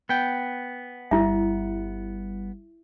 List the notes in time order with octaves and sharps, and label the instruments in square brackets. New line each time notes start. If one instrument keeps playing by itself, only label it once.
[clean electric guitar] B3 G5
[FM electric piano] G1 G3 [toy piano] E4 E5